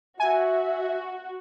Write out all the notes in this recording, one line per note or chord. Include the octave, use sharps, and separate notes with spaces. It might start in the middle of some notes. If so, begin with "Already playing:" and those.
F#4 E5 G#5